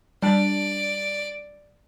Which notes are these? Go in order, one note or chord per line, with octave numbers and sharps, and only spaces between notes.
G3 D4 D5